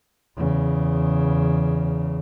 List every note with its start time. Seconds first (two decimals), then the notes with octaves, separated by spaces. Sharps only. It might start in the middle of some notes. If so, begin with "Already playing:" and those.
0.36 E2 C#3